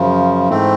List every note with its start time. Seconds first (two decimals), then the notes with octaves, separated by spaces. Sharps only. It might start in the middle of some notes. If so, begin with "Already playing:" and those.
Already playing: F#2 C#3 F3
0.48 G#2 E3 A3 C4